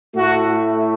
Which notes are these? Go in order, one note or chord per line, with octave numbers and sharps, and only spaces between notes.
A2 A3 F#4